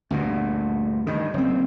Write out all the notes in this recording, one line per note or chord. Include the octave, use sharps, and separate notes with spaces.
D2 G2 A#2
G2 D#3
F#1 C4